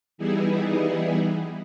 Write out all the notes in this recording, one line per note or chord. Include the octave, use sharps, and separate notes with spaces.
E3 G3 B3 D#4 E4 G#4